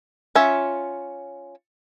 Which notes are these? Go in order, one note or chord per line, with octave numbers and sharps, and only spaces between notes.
C#4 F4 C#5 E5